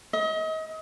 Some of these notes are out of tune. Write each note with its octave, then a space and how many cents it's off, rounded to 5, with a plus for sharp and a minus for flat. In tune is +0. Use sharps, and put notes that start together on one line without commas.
D#5 +35